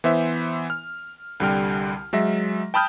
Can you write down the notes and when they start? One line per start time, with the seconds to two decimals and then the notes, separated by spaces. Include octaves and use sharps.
0.04 E3 B3 C5 E5
0.70 F6
1.40 C2 D3 G3 G5 F6
2.13 F#3 G#3 E5 A#6
2.74 G5 A5 B5 D#6 F6 G6